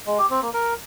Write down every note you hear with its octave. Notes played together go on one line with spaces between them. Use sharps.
G#3
G4
C4
A#3
A#4